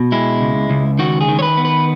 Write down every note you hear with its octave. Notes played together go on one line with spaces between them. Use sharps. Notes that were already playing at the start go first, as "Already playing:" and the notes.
Already playing: B2
G#3 E4
C#2
C#2
D#3 F#4
G#4
D#3
C#5
B4
B3
B4